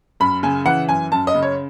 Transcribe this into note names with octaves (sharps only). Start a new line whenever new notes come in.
F#2 B5
C#3 G#5
E3 F#5
F#2 G#5
F#2 A5
D#5
C#3
C#5